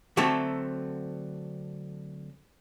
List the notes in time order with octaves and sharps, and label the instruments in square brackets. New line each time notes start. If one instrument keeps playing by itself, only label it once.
[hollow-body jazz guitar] D3 F#3 A3 C4 A4 E5